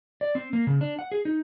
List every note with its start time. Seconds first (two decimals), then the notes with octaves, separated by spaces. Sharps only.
0.21 D5
0.35 C4
0.53 A#3
0.67 C#3
0.81 D4
0.99 F#5
1.12 G#4
1.25 D#4